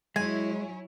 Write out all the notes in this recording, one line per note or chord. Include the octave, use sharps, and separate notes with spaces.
F#3 G#3 E4 C#5 G#5